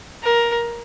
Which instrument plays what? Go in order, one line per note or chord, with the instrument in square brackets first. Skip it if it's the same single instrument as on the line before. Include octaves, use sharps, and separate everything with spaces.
[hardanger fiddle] A#4